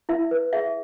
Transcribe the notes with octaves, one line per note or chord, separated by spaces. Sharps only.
E4 E5
B4
G#4 E5